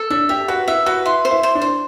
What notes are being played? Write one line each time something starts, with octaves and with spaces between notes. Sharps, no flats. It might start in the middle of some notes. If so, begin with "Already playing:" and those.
Already playing: A4
D4 E5
G4 E5
F#4 B4
E4 E5
F#4 B4
E4 C6
C5
E4
C5
D4
C5